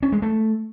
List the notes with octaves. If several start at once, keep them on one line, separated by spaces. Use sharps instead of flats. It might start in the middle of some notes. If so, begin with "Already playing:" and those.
C#4
G#3
A3